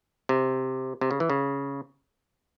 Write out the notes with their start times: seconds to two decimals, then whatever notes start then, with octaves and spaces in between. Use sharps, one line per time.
0.29 C3
1.01 C3
1.11 C#3
1.20 E3
1.30 C#3